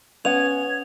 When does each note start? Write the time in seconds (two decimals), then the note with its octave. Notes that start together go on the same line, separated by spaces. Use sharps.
0.25 B3 C#4 F#5 G#6 F7